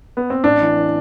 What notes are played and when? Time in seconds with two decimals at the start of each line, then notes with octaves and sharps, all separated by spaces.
0.17 B3
0.30 C4
0.44 A1 D4
0.61 E3
0.77 E3